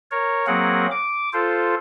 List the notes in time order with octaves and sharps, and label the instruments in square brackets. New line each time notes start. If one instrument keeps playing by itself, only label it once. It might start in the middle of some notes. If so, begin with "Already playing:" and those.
[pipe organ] A#4 C#5
F#3 A#3 C4 G#4 A#4 F#5
D6
F4 A4 C5